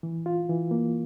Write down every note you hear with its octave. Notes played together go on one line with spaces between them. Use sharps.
E3
F4
E3
A#3